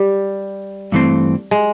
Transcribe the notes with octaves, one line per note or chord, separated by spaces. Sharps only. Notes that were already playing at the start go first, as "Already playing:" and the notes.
Already playing: G3
G2 E3 A3 C4
G#3